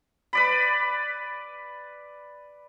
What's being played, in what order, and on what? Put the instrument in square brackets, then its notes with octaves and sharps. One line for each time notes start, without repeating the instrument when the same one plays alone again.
[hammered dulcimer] B4 D5 B5